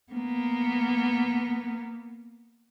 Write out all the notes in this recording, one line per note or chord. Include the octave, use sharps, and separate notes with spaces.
A#3 B3